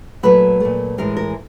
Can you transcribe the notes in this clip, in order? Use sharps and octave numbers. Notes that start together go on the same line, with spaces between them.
A#2 F#3 A3 B4
A#2 F#3 A3
A2 E3 G#3 A#4
A#4